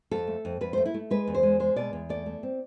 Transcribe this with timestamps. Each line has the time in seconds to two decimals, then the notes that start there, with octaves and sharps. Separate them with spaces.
0.11 F2 A4
0.27 A3
0.45 F2
0.61 F2 B4
0.73 A3 C5
0.86 E4
0.94 A3
1.11 G#3 B4
1.27 E2
1.35 C5
1.43 G#3
1.60 G#3 C5
1.76 B2 D5
1.93 E2
2.09 A3 D5
2.26 A3
2.43 C4